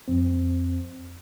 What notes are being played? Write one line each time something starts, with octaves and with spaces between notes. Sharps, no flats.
F2 C4